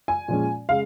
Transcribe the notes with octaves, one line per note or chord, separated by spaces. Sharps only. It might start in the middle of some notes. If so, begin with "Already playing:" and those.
G#5
A#2 F3 G#3 C#4
C#3 G#3 F5